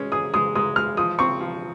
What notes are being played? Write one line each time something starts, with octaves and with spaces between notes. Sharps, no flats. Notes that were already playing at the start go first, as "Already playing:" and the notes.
Already playing: G#3 C#4
G#4 D#6
G#3 D#6
G#3 D#6
G#3 F6
F3 D#6
C4 C#6
F3